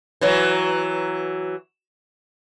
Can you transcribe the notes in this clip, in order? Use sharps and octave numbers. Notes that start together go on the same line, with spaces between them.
E3 F#3